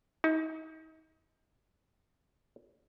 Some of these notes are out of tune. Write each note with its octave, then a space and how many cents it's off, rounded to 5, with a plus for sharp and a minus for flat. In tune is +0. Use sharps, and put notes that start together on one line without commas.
D#4 +35